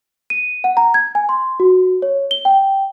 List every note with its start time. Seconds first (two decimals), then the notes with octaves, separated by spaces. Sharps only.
0.30 D#7
0.64 F#5
0.77 A#5
0.94 G#6
1.15 G#5
1.29 C6
1.60 F#4
2.02 C#5
2.31 G7
2.45 G5